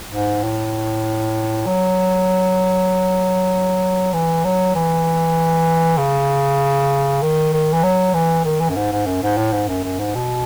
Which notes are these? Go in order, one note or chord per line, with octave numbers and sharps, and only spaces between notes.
G#2
A2
F#3
E3
F#3
E3
C#3
D#3
D#3
E3
F#3
E3
D#3
E3
F#2
G#2
G#2
F#2
G#2
A2
G#2
F#2
F#2
G#2
B2